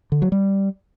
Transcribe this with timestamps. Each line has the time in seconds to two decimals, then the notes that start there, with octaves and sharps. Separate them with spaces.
0.12 D3
0.22 F#3
0.32 G3